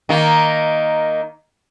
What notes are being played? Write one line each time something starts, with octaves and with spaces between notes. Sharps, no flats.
D#3 A#3